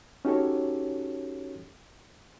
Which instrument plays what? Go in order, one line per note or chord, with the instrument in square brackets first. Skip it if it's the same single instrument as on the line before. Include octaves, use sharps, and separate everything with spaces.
[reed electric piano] C#4 D#4 F#4 G4 A4 C#5